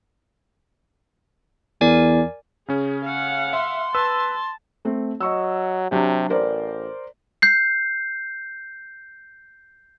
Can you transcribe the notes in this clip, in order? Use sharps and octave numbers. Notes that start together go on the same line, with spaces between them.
E2 A#4 D5 G#5
C#3 C#4 G#4
F5 F#5
E5 C6
B4 A5 E6
A3 C4
F#3 D#5 C#6 E6
C3 F#3 D4 G4
A1 A#4 C5 D5
G6 C7